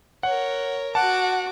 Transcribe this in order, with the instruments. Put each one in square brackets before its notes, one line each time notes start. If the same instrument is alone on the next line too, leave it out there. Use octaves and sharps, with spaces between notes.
[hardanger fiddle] A#4 C#5 [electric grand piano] F#5
[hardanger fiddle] F#4 D6 [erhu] F#5 [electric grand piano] A5